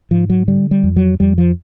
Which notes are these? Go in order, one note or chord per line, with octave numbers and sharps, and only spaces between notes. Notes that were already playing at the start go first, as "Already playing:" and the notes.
G#2 F3
F#3
D3 G3
G3
F2
F#3
F2 G3
F3